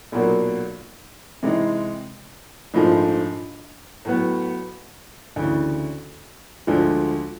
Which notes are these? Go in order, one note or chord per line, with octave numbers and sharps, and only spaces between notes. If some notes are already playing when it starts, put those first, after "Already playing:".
B1 A#2 F#3 A#3
C3 E3 G#3 C4 D#4
A#1 G#2 F3 A3
A2 F#3 B3
D2 C#3 E3
D2 D3 F3 G#3